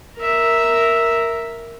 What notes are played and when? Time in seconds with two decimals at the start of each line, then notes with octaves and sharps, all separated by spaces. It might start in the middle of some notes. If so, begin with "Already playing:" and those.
0.17 A#4 E5